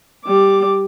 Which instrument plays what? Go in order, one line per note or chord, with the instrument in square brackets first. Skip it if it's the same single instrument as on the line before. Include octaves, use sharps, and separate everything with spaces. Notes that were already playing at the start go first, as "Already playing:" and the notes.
[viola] G3 D6